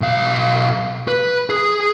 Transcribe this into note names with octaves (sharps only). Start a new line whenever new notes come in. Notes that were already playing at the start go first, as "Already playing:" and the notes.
B1 F5
B4
G#4